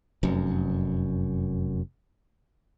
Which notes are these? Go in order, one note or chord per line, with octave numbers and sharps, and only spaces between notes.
F1 F#2